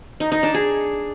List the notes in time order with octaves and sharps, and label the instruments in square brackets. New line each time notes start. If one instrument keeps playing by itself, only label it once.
[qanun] D#4
D#4
D4
G#4